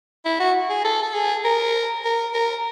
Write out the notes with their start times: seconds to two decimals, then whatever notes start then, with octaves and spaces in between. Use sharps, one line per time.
0.25 E4
0.40 F#4
0.69 G#4
0.84 A4
1.02 A4
1.14 G#4
1.44 A#4
2.04 A#4
2.34 A#4